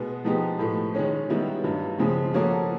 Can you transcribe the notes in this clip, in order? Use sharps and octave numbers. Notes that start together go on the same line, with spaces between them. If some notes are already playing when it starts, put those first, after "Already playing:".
Already playing: B2 G#3 B3
F3 G#3 B3 D#4 G4
A2 F3 A3
D#3 G#3 C#4
D#3 G3 B3 E4
G2 D#3 F#3
C#3 F3 G#3 C4
F3 A#3 C#4 F#4 A4